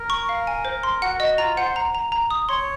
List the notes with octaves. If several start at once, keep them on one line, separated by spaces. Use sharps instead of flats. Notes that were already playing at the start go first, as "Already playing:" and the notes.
Already playing: A#4
C#6
F5
G#5
C5
C6
F#4 F#5
F#4 D#5
F4 A#5
C5 F#5
A#5
A#5
A#5
D#6
C#5 C6